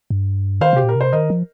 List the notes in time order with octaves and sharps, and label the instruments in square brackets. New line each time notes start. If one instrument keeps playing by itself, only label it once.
[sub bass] G2
[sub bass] D#3 [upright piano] C5 F5
[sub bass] C3 [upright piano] G4
[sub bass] A#2 [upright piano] A#4
[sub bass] C3 [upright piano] C5
[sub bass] D#3 [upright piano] A#4 D#5
[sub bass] F3